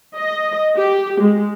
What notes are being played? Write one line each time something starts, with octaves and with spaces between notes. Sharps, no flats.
D#5
G4
G#3